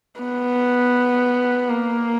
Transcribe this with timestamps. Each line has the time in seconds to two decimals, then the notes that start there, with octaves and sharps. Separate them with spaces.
0.21 B3
1.69 A#3